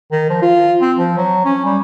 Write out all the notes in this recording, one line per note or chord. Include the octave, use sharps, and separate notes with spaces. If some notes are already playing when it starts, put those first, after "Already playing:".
D#3
F3
F4
C4
F3
F#3
C#4
G3